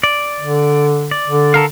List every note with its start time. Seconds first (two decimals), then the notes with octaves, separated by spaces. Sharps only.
0.03 D5
0.41 D3
1.11 D5
1.27 D3
1.54 A4 A#4 F5